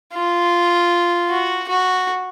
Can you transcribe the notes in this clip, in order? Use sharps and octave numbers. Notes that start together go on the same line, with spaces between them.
F4
F#4
F#4